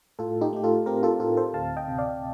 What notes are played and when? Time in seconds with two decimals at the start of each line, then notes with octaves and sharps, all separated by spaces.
0.19 A2 F4 A4
0.41 D#4 G4
0.53 A3 G4
0.63 F4 A4
0.86 C4 G4 A#4
1.03 F4 A4
1.20 A2 F4 A4
1.37 A4 C5
1.53 D2 F5 A5
1.77 D#5 G5
1.88 C3
1.98 D5 F5